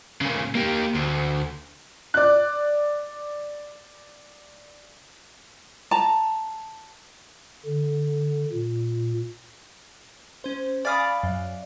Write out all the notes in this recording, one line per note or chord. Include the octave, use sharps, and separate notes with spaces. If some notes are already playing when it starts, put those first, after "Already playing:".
A#2 C#3
A#3 G4
D2
D5 F#6
A5 A#5
D3
A#2
C#4 C5
D5 F5 G#5 B5 D#6 A6
F#2